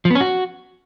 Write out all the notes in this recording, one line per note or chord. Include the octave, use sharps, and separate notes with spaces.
F3
B3
C#4
F#4